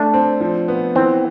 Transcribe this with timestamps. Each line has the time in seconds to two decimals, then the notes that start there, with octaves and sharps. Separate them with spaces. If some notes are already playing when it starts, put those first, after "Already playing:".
Already playing: A3 D4
0.14 C4
0.41 F3
0.68 B3
0.95 E3 C4